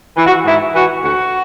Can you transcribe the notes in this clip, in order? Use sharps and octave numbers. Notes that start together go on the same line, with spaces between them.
E3
F#4
G#2 E4
E3 F#4
D2 F#4